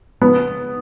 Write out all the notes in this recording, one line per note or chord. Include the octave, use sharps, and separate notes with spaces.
B3